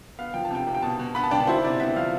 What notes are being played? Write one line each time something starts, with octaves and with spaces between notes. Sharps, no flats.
B3 F5
F3 G5
A5
C3 G5
C3
G5
B2 A5
B2
B3 B5
A5
D4 G5
A5
E4 C5
C3 D5
B3 E5
F3 F5